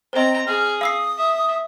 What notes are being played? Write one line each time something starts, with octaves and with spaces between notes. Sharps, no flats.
C4 C5 D#5 A#5
G#4 F6
F5 D#6 E6 C7
E5